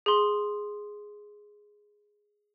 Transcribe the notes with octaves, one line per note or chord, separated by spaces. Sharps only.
G#4 C6